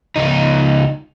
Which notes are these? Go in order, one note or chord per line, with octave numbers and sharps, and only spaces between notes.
C#2 D#4